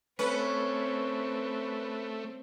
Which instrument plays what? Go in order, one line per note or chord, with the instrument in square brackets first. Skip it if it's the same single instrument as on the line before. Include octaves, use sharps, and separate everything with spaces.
[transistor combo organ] A3 [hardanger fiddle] C4 [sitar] C#4 [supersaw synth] B4